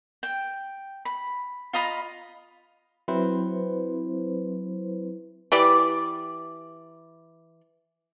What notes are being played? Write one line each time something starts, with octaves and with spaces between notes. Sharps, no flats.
G5
B5
F4 D#5 A#5 B5
F#3 C4 E4 B4 C5
E3 G4 D5